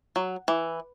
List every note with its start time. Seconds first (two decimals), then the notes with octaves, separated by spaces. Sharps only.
0.16 F#3
0.48 E3